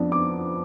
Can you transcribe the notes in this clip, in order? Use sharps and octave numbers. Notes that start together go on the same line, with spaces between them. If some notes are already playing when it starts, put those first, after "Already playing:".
Already playing: F2 F3 B3 D4
D6